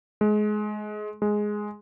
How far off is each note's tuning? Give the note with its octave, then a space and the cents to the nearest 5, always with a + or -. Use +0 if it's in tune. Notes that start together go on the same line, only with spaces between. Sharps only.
G#3 +25
G#3 +5